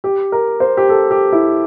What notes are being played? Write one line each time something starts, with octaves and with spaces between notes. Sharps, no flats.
G4
A#4
C5
G4
A4
G4
E4